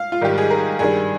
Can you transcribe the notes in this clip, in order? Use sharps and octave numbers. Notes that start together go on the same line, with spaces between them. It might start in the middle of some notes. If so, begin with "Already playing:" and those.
Already playing: F5
F4
G#2 D#3 G3 G4
G#4
A#4
G2 D#3 G3 G#4